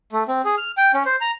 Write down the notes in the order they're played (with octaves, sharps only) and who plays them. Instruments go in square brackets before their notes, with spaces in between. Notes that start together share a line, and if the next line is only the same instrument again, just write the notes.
[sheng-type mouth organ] A3
C4
G#4
F6
G5
C#4
C5
A#5